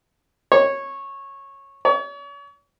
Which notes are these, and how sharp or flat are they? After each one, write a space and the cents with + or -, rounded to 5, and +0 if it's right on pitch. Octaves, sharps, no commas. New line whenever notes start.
C#5 -15
C#5 +40